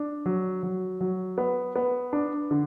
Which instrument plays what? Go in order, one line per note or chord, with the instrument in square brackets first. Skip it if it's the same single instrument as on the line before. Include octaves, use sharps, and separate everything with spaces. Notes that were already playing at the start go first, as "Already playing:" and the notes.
Already playing: [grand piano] D4
F#3
F#3
F#3
B3
B3
D4
D3